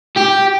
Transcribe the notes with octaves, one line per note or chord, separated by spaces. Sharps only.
G4